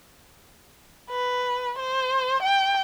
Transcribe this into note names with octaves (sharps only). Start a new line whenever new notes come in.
B4
C5
G5